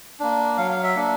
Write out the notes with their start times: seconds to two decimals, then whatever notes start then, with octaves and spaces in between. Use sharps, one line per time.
0.20 A#3 D4
0.57 F#3 F5
0.71 F5
0.83 E5
0.95 A#3 D4